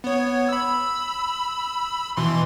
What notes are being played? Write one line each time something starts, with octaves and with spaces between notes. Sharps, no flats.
B3 C#5
B5 E6
B2 E3 C6